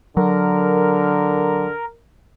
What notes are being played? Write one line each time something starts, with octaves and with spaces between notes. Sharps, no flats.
D3 F#3 A#4